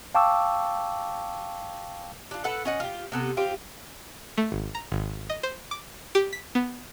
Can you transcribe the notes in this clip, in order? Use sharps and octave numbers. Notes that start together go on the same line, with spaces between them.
F5 G5 A5 C#6 D6 E6
D4 F4
A4 B4 F#5
C#4 D#5 F#5
F4 G4
C3 B3 A4
C4 F4 G4
A3
G#1
A#5
G#1
D#5
C5
D6
G4
B6
B3